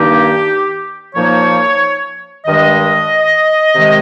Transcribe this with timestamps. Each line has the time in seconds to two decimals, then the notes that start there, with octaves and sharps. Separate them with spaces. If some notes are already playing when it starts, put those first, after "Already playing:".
Already playing: G2 D#3 A#3 D#4 G4
1.15 A#2 F3 A#3 D#4 C#5
2.46 G2 D#3 G#3 D#5
3.75 C3 D#3 G#3